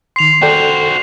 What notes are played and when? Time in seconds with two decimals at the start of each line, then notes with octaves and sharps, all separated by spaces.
0.16 D#3 C6 C7 F7
0.42 F#4 A4 C5 D5 G5